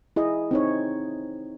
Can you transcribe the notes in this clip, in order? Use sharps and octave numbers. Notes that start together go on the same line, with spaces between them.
E4 G#4 D#5
C4 D#4 C#5